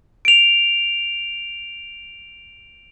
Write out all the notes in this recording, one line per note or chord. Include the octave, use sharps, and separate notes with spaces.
D7 F7